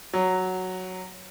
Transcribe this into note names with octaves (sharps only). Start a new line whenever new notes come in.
F#3